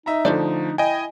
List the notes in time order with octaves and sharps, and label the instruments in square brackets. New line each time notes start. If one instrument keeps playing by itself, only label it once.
[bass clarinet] D#4 [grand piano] D#5 E5 A#5
[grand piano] D3 A3 [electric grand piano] F3 [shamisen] A4 C5 D5
[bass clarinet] E4 [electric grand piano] D#5 G#5 [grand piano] G5